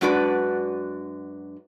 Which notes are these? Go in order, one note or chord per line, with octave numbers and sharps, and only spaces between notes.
F#2 G#3 D4 F#4 B4 D5